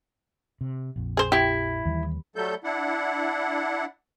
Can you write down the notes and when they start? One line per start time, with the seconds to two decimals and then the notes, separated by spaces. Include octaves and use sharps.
0.61 C3
0.96 A#1 F2
1.17 G#4 C5
1.32 E4 G4
1.85 D#2 E3 G3
2.36 F#3 G3 A3 A4 G6
2.64 D4 E4 F#5